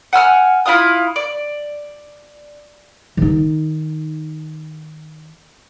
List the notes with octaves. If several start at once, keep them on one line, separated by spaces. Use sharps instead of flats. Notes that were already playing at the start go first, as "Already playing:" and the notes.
F#5 G#5 E6 F6
E4 F4 F5 D#6
D5
D#3 D#4